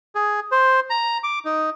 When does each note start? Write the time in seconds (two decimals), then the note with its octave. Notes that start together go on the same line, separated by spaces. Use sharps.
0.15 G#4
0.52 C5
0.90 A#5
1.23 D6
1.45 D#4